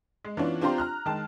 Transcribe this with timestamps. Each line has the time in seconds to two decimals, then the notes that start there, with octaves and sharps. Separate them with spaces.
0.25 G#3
0.37 E3 B3 C#4 D4 F4
0.61 C4 D4 F4 G4 A#5 C6
0.78 A#5 F6 F#6
1.06 D#3 G#3 A5